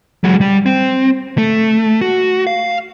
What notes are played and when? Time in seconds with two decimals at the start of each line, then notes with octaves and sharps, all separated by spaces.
0.24 F#3 G#3
0.41 G3
0.66 C4
1.38 A3
2.01 F#4
2.47 F5